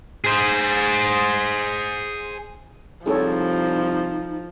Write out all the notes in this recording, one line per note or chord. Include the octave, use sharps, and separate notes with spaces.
G#4 C5
C2 F3 D#4 G#4 A4 C#5